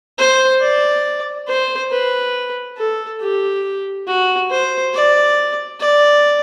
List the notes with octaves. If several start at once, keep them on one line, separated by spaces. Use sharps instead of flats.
C5
D5
C5
B4
A4
G4
F#4
C5
D5
D5